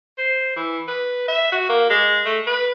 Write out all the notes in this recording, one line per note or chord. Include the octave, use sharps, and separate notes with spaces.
C5
E3
B4
E5
F#4
A#3
G#3
A3
B4